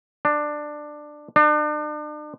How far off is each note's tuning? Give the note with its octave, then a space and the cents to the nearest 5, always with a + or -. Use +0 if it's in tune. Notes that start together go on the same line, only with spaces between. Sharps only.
D4 +15
D4 +40